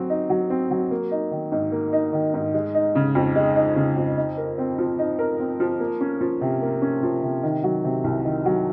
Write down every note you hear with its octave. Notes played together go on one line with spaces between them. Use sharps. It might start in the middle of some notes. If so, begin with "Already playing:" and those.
Already playing: F#3 C4
D#4
F#3
C4
F#3
A#3
D#4
D#3
G#2
A#3
D#4
D#3
G#2
G#3
D#4
C#3
F2
G#3
D#4
C#3
F2
D#4
A#4
C4
F3
D#4
A#4
C4
F3
A#3
C#4
F3
C3
A#3
C#4
F3
C3
D#3
F#3
C3
C2
D#3
F#3